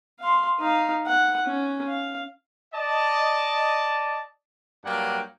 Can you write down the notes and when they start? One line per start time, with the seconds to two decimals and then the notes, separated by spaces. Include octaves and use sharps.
0.20 F5 C6
0.59 D#4 F5
1.06 F#5
1.46 C#4
1.87 F5
2.74 D5 D#5 A5
4.84 G2 F#3 A#3 D4 F#5 G5